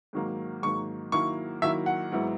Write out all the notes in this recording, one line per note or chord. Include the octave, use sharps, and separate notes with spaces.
G#2 D#3 F#3 A#3
G#2 D#3 F#3 A#3 C#6
D#3 F#3 A#3 E4 C#6
D#3 F#3 A#3 E4 E5
F#5
G#2 F#3 B3 E4